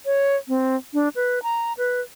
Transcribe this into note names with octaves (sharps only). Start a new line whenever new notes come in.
C#5
C4
D4
B4
A#5
B4